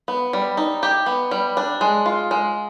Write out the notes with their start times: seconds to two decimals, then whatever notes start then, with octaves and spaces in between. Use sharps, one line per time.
0.08 B3
0.33 G3
0.57 D#4
0.83 G4
1.06 B3
1.31 G3
1.57 D4
1.81 G#3
2.06 F4
2.31 G#3